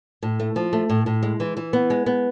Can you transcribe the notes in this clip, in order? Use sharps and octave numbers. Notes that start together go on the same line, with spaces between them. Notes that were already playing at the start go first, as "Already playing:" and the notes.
A2
A3
F3
A3
A2
A2
G#3
E3
E3
B3
G#3
B3